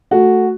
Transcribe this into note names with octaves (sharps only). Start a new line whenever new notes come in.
A3 F#4